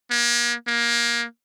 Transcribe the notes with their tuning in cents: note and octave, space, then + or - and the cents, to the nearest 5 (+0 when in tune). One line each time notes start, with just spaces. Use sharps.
A#3 +40
A#3 +20